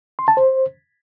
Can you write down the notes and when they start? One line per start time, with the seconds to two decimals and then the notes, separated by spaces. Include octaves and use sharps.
0.19 C6
0.28 A5
0.37 C5